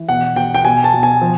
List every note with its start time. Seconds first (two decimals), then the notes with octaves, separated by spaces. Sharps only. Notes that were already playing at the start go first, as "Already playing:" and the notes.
Already playing: E3
0.09 B2 F#5
0.36 B2 G5
0.54 G5
0.65 B2 G#5
0.84 A5
0.94 B2
1.03 G#5
1.22 F3